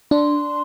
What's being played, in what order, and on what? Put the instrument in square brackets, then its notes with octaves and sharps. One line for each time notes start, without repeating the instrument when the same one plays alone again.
[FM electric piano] D4 [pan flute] C6